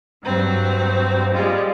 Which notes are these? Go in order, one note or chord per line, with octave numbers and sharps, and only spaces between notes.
G2 F#3 C4
G3 G#3 F4